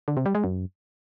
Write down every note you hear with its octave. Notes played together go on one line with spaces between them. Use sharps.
D3
C3
G3
G#3
F#2